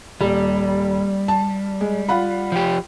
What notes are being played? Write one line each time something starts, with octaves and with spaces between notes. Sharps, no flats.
D#1 G3
A5
G#3
F4 F#5 B5
F3 G4